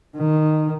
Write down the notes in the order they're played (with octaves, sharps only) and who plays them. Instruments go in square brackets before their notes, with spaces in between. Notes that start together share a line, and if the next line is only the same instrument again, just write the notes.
[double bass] D#3